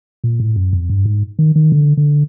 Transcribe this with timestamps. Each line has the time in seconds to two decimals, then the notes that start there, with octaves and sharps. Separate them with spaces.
0.24 A#2
0.40 A2
0.56 F#2
0.73 F2
0.89 G2
1.06 G#2
1.39 D#3
1.56 D#3
1.72 D3
1.97 D3